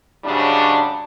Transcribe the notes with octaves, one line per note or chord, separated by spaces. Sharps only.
G#2 C#3 F#3 G3 D4